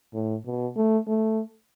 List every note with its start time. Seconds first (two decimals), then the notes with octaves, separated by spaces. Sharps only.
0.13 A2
0.45 B2
0.76 A3
1.07 A3